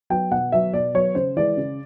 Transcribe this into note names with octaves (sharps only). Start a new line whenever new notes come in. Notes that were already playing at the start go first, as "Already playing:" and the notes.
F#3 B3 G5
B2 F#5
F#3 B3 E5
B2 D5
F#3 B3 C#5
C#3 C5
E3 G#3 D5
C#3